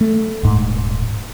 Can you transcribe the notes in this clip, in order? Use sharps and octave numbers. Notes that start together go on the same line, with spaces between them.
A3
D#1 G#2